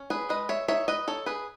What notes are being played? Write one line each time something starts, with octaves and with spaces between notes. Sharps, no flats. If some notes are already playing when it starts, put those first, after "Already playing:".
Already playing: C#4
G#4 B4
G#3 B4 D#5
C#5 E5
D#4 C#5 E5
B4 D#5
D#4 A4 C#5
G#4 B4